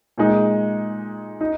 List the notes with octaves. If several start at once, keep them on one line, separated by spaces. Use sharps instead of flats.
A#2 G#3 D#4
D#4